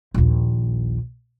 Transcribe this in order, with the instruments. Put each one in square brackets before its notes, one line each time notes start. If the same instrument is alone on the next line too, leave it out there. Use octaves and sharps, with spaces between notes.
[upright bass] A#1 D#2